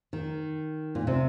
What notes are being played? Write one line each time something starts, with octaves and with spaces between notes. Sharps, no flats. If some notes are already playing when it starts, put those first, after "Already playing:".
D#3
A#2
C3